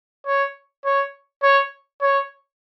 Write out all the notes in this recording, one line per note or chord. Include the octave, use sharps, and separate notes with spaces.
C#5
C#5
C#5
C#5